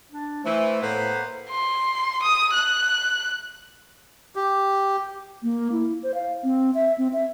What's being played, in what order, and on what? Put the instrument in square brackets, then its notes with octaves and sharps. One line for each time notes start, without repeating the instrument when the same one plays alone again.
[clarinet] D4
[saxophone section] E3 [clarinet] A3 [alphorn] C5
[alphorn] A2 [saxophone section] A#3 B3 [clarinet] C5
[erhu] C6
D#6
F#6
[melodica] G4
[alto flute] A#3
E4
C5
F5
C4
E5
C4
E5